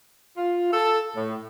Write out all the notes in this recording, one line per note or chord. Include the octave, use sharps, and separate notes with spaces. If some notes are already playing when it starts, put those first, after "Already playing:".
F4
A4
A2